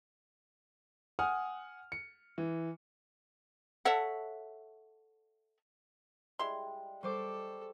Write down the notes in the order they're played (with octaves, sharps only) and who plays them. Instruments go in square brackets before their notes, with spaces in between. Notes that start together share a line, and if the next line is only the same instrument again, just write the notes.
[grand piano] F#5 G#5 D#6 F6
C#7
E3
[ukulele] A4 C#5 E5 F#5
[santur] G3 G#3 [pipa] E4 C6
[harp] G3 C5 D6 [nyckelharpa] A4 [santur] C#6